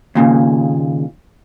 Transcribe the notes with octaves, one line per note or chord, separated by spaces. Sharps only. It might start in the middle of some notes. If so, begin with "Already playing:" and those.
D#2 A#2 C#3